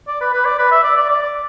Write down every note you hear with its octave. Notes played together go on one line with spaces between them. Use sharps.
D5
B4
B4
D5
B4
E5
D5
D5
D5
D5